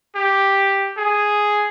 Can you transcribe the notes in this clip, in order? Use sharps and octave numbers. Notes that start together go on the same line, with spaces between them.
G4
G#4